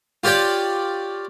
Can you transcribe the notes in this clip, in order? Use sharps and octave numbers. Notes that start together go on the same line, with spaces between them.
F4 G4 C#5 D5 G5